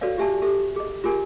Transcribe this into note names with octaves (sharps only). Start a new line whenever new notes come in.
F#4 A4 B4 C#5 D5 F5
F4 G4 E5 G#5 A5
G4 A4 E5
G#4 D#5
F4 G4 G#4 A#4 G#5